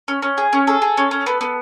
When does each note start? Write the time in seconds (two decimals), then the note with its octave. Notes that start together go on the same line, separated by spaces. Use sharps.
0.08 C#4
0.22 C#4
0.38 G#4
0.53 C#4
0.67 G#4 A4
0.82 G#4
0.97 C#4
1.11 C#4
1.26 B3
1.41 B3